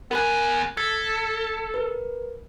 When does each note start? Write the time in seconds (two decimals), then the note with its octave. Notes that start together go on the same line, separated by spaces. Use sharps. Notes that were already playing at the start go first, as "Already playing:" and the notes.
0.11 B3 A#4 G#5 B5 F#6
0.77 A4 G#6 B6
1.74 A#4 B4